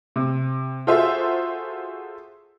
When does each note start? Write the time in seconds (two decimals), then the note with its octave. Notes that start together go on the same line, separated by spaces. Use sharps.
0.16 C3
0.87 F4 F#4 G#4 A4 C5 E5